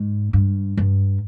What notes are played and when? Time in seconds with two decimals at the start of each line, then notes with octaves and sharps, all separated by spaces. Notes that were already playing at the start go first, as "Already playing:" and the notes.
Already playing: G#2
0.33 G2
0.77 G2